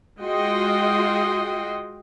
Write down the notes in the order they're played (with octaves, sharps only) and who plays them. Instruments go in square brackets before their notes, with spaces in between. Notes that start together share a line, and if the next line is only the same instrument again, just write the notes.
[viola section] G#3 F4 F#4 D#5 G5 C6